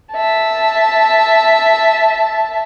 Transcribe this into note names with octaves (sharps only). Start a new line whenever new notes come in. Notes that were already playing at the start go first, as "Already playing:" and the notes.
E5 A5